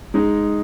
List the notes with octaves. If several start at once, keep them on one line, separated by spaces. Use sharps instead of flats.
G#3 D#4